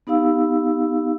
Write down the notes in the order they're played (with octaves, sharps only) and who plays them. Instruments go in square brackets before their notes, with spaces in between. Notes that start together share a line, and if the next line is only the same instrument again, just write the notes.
[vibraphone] B3 D#4 G4 F5 E6